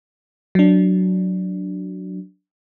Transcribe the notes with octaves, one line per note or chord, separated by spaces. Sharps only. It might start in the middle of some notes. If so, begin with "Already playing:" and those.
F#3 D4